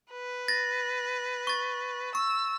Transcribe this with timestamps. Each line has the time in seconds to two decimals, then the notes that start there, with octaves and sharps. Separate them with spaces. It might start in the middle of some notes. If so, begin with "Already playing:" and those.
0.12 B4
0.48 A6 A#6
1.47 C#6 A6
2.15 C#6 E6